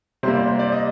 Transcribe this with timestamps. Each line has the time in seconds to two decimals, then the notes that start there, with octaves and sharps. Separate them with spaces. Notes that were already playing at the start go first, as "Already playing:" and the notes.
0.23 C3 G3 A#3 C5
0.35 D5
0.48 C5
0.59 D5
0.72 D#5